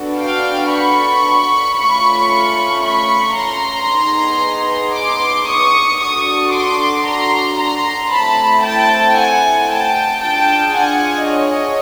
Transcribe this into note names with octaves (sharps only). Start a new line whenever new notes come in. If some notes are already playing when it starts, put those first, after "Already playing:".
Already playing: B3 D4 F#4 A4
F5 G5
B5 C#6
A3 C#4 F4 B5 C#6
B5 C#6
A#5 C6
B3 D#4 G#4
C6 D6
C#6 D#6
D4 F#4 A4 C#6 D#6
C6 D6
A#5 C6
A#5 C6
A3 C4 E4 A4 A5 B5
G5 A5
F#5 G#5
G5 A5
D4 F4 G#4 G5 A5
F#5 G#5
C#5 D#5